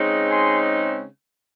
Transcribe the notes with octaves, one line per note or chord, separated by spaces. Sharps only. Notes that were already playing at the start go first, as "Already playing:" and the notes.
Already playing: C#3 G#3 C4 D#4
G#5 C6